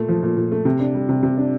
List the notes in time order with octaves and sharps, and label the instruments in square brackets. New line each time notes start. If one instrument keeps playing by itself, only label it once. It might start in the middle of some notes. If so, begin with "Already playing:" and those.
Already playing: [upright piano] A#2 A3
F3
A#2
A#2
A3
C3
D4
G3
C3
C3
D4